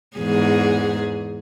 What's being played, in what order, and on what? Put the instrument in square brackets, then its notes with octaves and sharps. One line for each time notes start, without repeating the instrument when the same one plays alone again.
[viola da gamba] E2 G#2 G#4